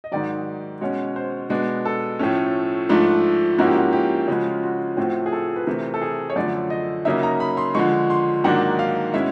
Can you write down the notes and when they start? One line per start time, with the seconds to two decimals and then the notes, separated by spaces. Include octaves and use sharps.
0.04 D#5
0.11 G#2 D#3 F#3 D5
0.81 B2 G#3 C#4 C#5
1.16 C5
1.50 B2 G#3 B3 D4
1.85 A4
2.19 A2 F3 A3 C#4
2.89 G#2 F3 A3 D4
3.58 G#2 F3 A#3 C#4 E4 F#4
3.67 G4
3.75 F#4
3.93 G4
4.28 C#3 F3 G#3 F#4
4.46 F4
4.63 F#4
4.97 A2 F3 A3 C4 F#4
5.26 G#4
5.32 A4
5.56 B4
5.66 C3 E3 A3 C4 A#4
5.94 A4
6.01 G#4
6.30 C#5
6.36 F#2 D3 F3 A3 D5
6.70 D#5
7.05 C#3 F#3 A#3 D#4 E5
7.23 A#5
7.40 B5
7.57 C6
7.75 D3 F3 G#3 C#6
8.10 C6
8.44 G#2 D#3 F#3 A#3 D4 F#5
8.79 F5
9.14 B2 G#3 C#4 E4 E5